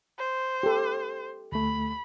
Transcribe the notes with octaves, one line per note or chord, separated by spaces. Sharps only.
C5
G4 A4
D2 A3 B5